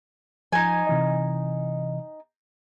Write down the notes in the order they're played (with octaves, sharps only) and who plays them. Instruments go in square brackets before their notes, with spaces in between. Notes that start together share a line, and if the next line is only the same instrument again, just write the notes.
[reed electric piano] F3 [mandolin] D#4 G#5
[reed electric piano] C3 E3 D#5